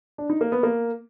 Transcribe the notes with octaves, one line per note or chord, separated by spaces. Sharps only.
D4
D#4
A#3
B3
A#3